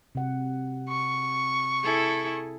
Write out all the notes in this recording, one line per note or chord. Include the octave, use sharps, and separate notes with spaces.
C3 F#5
C#6
E4 G#4 A4